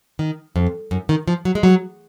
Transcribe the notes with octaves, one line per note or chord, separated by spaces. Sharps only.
D#3
F2
F#2
D#3
F3
F#3
G#3
F#3